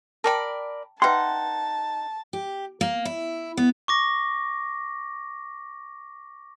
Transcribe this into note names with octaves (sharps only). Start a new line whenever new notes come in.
A#4 D5 G5 A5 B5
D#4 B4 E5 F#5 G5 A5 C6
G4
A#3
E4
B3
C#6 D6 A#6